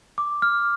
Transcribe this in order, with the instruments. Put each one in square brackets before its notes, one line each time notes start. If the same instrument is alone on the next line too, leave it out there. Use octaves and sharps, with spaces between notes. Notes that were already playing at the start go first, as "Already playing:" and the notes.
[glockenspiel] D6
F6